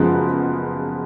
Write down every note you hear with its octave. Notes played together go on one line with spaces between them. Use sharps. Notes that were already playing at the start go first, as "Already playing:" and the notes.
Already playing: F#1 F#2 F3 G#3 B3